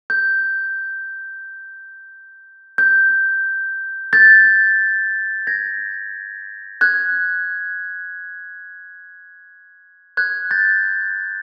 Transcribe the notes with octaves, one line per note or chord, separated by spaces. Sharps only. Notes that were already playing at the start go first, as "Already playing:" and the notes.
G6
G6
G6 A6
G#6 A#6
F#6 G#6
F#6 G#6
G6 A6